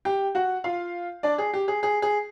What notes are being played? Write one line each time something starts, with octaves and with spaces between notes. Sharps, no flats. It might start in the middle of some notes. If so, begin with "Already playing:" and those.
G4 G5
F#4 F#5
F4 F5
D4 D5
G#4
G4
G#4
G#4
G#4